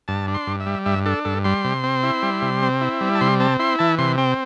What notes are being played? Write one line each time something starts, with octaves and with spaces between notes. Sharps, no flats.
G2 A5
D4
C6
G2
E5
G3
G2 E5
D4 A4
G2 A4
G3 C6
C3
C4
E4
G3
C3
C4
E4
G3
A5
C3 C6
C4 A5
E4 C6
E3 A5
C3 C6
C4 G5